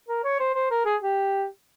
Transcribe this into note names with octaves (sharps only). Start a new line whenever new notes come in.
A#4
C#5
C5
C5
A#4
G#4
G4